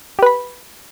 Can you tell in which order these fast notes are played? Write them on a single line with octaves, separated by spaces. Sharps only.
G4 B4 B5